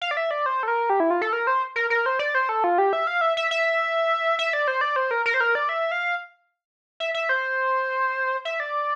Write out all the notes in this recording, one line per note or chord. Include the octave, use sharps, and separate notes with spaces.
F5
D5
E5
D5
C5
A4
A#4
G4
E4
F4
A4
A#4
C5
A#4
A#4
C5
D5
C5
A4
F4
G4
E5
F5
E5
E5
E5
E5
D5
C5
D5
C5
A#4
A#4
C5
A#4
D5
E5
F5
E5
E5
C5
E5
D5